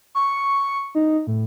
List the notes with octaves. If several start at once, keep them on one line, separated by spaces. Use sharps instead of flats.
C#6
D#4
A2